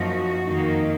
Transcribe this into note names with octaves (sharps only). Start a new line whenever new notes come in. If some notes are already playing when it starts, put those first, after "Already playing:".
Already playing: F#2 F3 A#3 D#4 F#4
F2 D#3 A#3 D#4